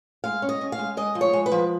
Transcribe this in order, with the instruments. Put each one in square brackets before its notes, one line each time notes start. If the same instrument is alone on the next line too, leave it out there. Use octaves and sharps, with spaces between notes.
[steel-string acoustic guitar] G#3 F5
C#4
D#5
C#4
F5
G#3
G#3 D#5
F3
C#5
G#3
B4
F3